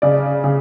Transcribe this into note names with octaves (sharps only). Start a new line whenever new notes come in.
C#3 D5
C#3